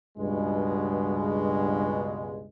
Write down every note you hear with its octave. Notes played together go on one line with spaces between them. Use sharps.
C#2 G2 B2 G#3